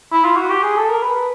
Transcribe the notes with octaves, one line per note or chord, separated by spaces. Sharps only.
E4
F4
F#4
G4
G#4
A4
A#4
B4